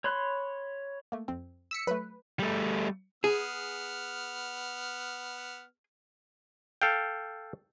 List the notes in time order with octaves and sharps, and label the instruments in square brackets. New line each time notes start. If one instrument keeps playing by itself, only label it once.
[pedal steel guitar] C#5 B5 C6 F#6
[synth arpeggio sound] A3 A#3
F2 C4
[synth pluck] E6 B6 C#7
[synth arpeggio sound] F#3 A3 [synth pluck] B4
[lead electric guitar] G3 A3
[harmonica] B3 F6 [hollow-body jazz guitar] G#4
[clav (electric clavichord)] A4 F5 G5